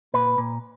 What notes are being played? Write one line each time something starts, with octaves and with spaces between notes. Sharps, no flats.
A#2 B4
A#2